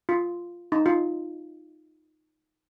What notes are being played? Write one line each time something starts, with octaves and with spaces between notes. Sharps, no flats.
F4
D#4
F4